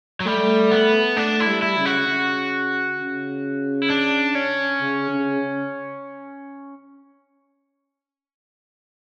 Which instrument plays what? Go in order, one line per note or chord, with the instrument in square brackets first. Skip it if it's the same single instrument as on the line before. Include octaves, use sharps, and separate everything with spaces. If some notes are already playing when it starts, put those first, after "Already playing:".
[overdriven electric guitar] F#3
[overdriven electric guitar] G3 [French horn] A3
[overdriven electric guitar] B3
[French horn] A3 [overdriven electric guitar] D4
[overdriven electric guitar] E4
[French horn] G3
[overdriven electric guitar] E4
[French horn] C#3
[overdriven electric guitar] F#4
[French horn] C#3
C#3
[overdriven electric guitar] E4
D4
C#4
[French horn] C#3
C#3